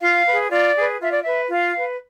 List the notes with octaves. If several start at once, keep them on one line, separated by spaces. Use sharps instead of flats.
F4 F5
G#4 B4
F4 D5
G#4 B4
F4 E5
D5
B4 E5
F4 F5
B4